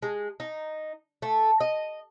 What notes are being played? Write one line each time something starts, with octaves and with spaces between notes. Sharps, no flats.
G#3
D#4
A3
D#5